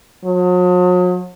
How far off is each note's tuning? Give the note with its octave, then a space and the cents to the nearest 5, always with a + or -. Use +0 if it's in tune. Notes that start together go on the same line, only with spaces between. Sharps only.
F#3 -45